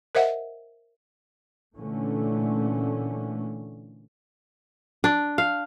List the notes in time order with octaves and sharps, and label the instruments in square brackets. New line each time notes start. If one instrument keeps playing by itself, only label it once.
[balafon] A#4 C5 D#5 E5 F#5
[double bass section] A#2 D3 E3 A3 C#4
[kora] D4
F5